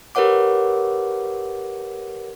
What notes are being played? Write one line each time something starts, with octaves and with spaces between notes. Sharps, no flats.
G4 A#4 B4 C#5 F#5 D6